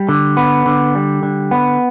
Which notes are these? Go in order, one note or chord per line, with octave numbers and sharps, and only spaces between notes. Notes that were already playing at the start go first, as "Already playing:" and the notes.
Already playing: G3
D3
B3
D3
G3
D3
B3